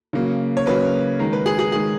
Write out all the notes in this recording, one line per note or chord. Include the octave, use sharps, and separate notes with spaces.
C#3 F#3 A#3
C#5
C#3 F#3 A#3 B4
D#3 G#3 A#4
B4
G#4
G#4
D#3 G#3 G#4